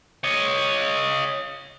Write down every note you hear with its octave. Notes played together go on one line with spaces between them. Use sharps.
C#5 D#5